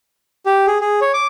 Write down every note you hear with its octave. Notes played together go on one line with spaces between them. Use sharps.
G4
G#4
G#4
C#5
D6